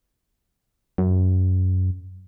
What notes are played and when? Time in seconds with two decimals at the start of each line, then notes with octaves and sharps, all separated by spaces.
0.98 F#2